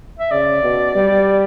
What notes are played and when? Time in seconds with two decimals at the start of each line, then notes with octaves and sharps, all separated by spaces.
0.19 E5
0.31 C#3 D5
0.63 B2
0.95 G3